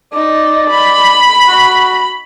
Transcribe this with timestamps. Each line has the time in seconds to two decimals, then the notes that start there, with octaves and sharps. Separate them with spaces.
0.13 D#4 D5
0.70 B5
1.48 F#4